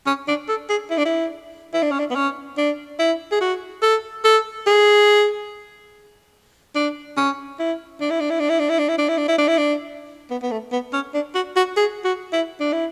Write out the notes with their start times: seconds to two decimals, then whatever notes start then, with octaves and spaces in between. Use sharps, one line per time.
0.06 C#4
0.28 D4
0.48 A4
0.70 G#4
0.90 E4
0.98 D4
1.05 E4
1.74 E4
1.82 D4
1.91 C#4
1.99 D4
2.10 B3
2.15 C#4
2.57 D4
2.99 E4
3.32 G#4
3.41 F#4
3.82 A4
4.25 A4
4.67 G#4
6.75 D4
7.17 C#4
7.59 E4
8.01 D4
8.10 E4
8.20 D4
8.30 E4
8.40 D4
8.50 E4
8.59 D4
8.69 E4
8.79 D4
8.89 E4
8.98 D4
9.09 E4
9.18 D4
9.28 E4
9.38 D4
9.48 E4
9.58 D4
10.30 B3
10.43 B3
10.51 A3
10.72 B3
10.93 C#4
11.14 D4
11.35 F#4
11.56 F#4
11.77 G#4
12.04 F#4
12.33 E4
12.60 D4
12.73 E4